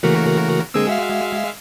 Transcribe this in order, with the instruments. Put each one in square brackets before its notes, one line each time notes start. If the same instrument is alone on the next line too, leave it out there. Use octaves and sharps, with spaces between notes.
[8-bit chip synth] C#3 F#4 A#4 [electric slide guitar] E3 A3 A#3
[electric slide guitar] D3 A#3 C4 [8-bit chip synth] G#3 G#4 E6
[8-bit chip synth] G#3 E5 F5 [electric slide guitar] F#4